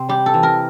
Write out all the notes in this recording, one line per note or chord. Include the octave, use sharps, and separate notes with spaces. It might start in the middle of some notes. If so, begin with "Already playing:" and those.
Already playing: C3 C4
G3 G4
A4
E3
A#4